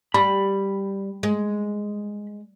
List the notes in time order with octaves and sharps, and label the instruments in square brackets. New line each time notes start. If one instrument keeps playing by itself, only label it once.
[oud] G3 [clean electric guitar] B5
[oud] G#3